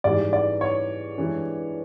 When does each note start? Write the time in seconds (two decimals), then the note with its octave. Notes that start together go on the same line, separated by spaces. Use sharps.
0.04 G#2 E3 G3 D5
0.33 D5
0.61 C#5
1.18 G2 E3 G#3